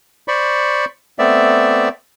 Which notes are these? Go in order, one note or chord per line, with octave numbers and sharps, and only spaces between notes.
C5 D5 B5 C#6
A3 B3 C4 D5 E5